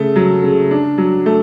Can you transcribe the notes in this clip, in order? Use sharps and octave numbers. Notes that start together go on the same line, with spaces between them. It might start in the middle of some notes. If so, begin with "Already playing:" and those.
Already playing: C#3 A3
F#3
C#3
D4
F#3
A3